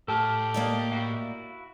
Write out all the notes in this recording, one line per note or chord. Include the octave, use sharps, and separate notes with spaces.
A2 G4 A4 A5 F6
A#3 D5 D#5
E4 F#4 F5